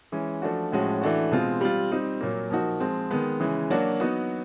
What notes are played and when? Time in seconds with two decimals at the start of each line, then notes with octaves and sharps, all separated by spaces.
0.12 E3 G#3 C#4
0.42 F3 A3 D4 F#4
0.72 A2 F3 G#3 C#4 F#4
1.01 E3 A3 D4 F#4
1.31 B2 G#3 C4 F4
1.61 G3 C4 F4
1.92 G3 C4 D#4
2.21 A#2 F#3 A#3
2.50 F3 A#3 D#4 F#4
2.80 F3 G#3 C4
3.11 D#3 G#3 B3
3.40 C#3 E3 G#3
3.70 F#3 A#3 D4 F#4
4.00 F#3 B3 D#4 F#4